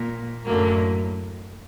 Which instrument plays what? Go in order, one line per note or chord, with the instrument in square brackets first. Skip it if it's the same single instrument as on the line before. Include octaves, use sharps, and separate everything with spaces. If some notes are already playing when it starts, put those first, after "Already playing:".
Already playing: [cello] A#2
[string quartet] F#2 D3 F#3 A#3 [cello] A2